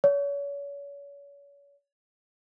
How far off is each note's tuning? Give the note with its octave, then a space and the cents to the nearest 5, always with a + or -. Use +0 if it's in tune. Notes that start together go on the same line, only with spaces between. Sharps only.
C#5 +35